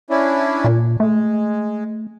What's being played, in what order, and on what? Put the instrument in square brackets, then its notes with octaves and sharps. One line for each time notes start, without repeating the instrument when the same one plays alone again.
[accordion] C#4 D4 E4
[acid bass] A#2
[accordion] G#3 [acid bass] A3